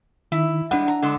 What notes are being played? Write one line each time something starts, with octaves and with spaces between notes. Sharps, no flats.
D#3 E4
G3 G#3 D4 F#5
A#5
D3 G#3